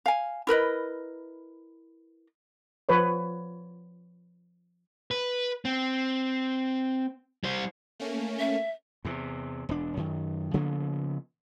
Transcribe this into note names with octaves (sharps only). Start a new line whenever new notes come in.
F5 G#5
E4 A#4 B4 D#5
F3 B4 C#5
B4
C4
G3 C5
A3 A#3 C#4
E5
E2 C3
E1 D4
F#2 D#3
C#3 F3 A#3 B3